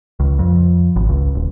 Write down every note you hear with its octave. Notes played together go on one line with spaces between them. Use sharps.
C#2
F2
G#1
C#2
D#1